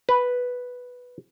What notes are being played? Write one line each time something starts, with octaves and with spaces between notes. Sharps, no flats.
B4